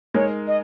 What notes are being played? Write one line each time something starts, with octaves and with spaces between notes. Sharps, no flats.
G#3 D#4 A#4 C#5
D#5